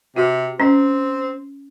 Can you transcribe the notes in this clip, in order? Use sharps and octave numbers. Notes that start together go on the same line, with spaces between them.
C3 F#4
C4 C#4